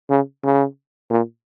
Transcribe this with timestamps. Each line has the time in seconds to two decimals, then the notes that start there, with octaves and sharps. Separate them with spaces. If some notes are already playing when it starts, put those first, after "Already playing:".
0.09 C#3
0.44 C#3
1.10 A#2